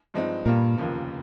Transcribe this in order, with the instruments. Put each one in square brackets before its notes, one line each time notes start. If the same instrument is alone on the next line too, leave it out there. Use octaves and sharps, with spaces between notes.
[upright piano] G2 F3 G#3 C4 D#4
[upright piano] G2 G3 A#3 F4 A#4 [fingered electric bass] A#2
[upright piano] F1 D#2 C#3 F3 A#3